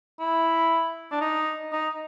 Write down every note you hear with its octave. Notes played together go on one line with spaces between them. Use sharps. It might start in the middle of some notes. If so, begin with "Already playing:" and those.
E4
D4
D#4
D#4